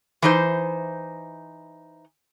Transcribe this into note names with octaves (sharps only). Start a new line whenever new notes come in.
E3 D#4 C5